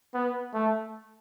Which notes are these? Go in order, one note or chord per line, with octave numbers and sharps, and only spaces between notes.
B3
A3